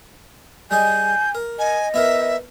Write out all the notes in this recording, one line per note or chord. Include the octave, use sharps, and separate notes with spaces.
G3 G#4 D#5 G#5 G6
A#4
D#5 G#5
B3 E4 A#4 E5